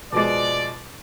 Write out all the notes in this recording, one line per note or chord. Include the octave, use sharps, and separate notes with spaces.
B2 F3 G#3 D5